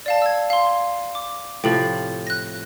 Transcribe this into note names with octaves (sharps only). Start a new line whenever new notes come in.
D5 F5 A5
E6 G#6
F5 C6
D6
A2 C3 F3 G5 F#7
F#6 A#6